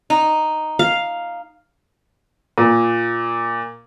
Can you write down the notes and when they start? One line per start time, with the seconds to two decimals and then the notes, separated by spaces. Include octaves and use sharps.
0.10 D#4
0.79 F5
2.58 A#2